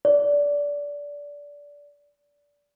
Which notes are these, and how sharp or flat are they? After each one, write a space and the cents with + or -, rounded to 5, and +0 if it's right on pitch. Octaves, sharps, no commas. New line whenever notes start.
D5 -20